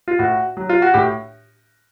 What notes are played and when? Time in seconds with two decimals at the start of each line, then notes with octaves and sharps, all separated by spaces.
0.08 F4
0.19 A2 F#4
0.57 F#3
0.69 F4
0.82 F#4
0.94 A2 G4